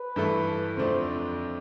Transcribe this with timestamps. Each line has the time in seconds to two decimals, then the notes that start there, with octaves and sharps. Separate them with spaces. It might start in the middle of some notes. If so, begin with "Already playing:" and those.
Already playing: B4
0.16 G2 E3 A3 E4 A4
0.76 F2 D3 F3 A3 D4 C5